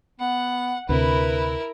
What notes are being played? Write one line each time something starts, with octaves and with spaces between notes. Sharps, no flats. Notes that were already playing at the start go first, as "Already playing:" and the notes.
B3 F#5
D2 C3 E4 A#4 B4